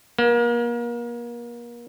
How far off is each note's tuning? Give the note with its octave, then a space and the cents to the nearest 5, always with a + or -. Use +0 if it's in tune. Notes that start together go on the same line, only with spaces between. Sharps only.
A#3 +35